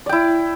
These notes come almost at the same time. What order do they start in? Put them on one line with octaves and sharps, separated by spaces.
D5 G5 E4